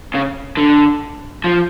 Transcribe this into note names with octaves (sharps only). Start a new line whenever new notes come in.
C#3
D3
F3